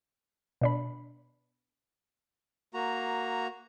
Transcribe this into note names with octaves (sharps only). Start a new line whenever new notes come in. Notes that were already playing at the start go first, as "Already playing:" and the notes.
B2 D4 B5
A#3 F#4 A#5